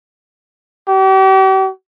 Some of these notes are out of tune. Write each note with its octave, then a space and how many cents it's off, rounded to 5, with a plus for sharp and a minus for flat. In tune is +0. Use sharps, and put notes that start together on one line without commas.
G4 -40